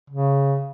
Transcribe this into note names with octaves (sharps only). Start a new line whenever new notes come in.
C#3